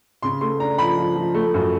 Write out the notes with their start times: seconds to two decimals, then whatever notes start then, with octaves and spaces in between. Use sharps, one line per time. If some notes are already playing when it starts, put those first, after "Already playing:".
0.23 C#3 C6
0.41 A3 C6
0.60 D4 A#5
0.78 F3 B5
0.98 F3
1.16 F3
1.35 A3
1.54 F#2